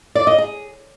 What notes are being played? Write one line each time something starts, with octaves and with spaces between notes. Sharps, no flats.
D5
D#5
G#4